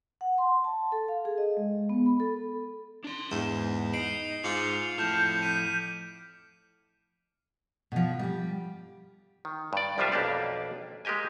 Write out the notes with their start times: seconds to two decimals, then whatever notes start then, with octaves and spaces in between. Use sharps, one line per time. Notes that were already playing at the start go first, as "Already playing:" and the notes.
0.21 F#5
0.38 C6
0.64 A5
0.92 A4
1.08 F5
1.25 G#4
1.38 D#5
1.57 G#3
1.89 B3
2.06 B5
2.20 A4
3.04 D4 C6
3.32 E2 G#2 E7
3.93 D#4 C7 D7 F#7
4.44 G#2 F4 D6 C#7 F#7
4.98 F2 A2 A5 F6 G6 E7
5.43 B6 D#7
7.92 B2 F3
8.19 G3 G4
9.45 D#3
9.73 G2 D5
9.98 C2 F3 G3 D4 F4 E5
10.12 B1 F2 A#3 D4 G4 D5
11.05 G#3 A#3 G4 D#5 G#5